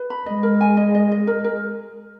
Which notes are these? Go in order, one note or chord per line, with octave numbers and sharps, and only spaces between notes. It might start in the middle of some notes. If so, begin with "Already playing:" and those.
Already playing: B4
B5
G#3 D#5
A#4
G#5
D#5
D#5
D#5
A#4
A#4